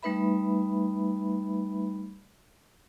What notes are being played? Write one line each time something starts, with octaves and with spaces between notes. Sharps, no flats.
G3 A3 D#4 B4 E5 B5